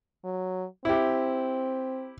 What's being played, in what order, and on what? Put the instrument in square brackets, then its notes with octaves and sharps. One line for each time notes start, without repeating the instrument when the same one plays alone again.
[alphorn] F#3
[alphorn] C4 [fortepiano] E4 G4